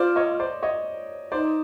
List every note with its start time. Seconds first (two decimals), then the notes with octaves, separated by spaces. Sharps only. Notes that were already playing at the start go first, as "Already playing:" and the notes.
Already playing: F4 C5 D5
0.16 C#5 D#5
0.40 C5 D5
0.63 C#5 D#5
1.32 D#4 C5 D5